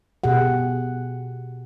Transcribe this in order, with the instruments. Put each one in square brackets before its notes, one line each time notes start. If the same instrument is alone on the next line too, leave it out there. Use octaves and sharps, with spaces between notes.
[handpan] B2 G4 G#4 F#5